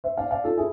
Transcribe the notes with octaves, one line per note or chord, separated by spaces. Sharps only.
C5 E5
D5 F5
D5 F5
F4 A4
E4 G#4